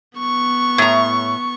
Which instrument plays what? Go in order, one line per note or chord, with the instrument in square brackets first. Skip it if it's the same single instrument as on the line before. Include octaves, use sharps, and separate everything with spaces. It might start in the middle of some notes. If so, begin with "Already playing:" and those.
[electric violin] B3 C#6
[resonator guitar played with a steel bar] A2 A#5